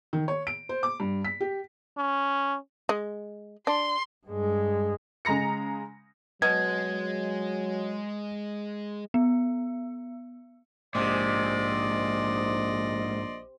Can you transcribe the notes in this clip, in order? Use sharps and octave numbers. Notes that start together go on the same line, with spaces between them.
D#3
C#5
D7
C5
D6
G2
B6
G4
C#4
G#3
D4 C6
G2 G#3
C#3 G#3 A#5 A#6 C#7
B2 F#3 G#3 G#6
B3
A#1 G#2 C3 D5 D#5 C6